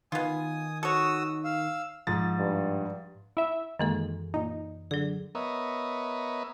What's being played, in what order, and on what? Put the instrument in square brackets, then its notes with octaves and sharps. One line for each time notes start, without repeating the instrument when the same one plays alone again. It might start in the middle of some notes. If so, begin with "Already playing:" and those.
[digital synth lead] D#3 [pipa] B3 F4 [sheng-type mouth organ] G#5 D#6
[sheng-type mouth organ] F#4 D#6 E6 [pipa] A4 C#5
[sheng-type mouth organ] F5 E6
[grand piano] G#2 F3 A6
[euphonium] G2
[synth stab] E4 E5
[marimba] F#2 E3 A4 [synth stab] D#3 G#3 A#3
[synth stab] A#2 D#4
[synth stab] D3 [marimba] F#3 G#4
[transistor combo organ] B3 A#4 C#5 D#5 E5